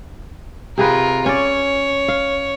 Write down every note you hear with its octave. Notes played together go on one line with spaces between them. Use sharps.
C3 F4 G#4 A#4 B4
C#4 C#5 D5
F5